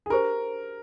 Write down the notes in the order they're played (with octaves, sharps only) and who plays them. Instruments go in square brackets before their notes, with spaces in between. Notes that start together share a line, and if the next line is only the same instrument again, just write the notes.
[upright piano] G#4
[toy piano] D4 G4 C5 [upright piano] A#4